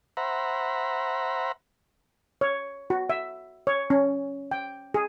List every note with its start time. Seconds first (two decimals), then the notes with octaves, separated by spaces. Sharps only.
0.17 C5 E5 F#5 A#5 B5
2.41 C#5
2.90 F#4
3.09 E5
3.67 C#5
3.90 C#4
4.51 G5
4.94 G#4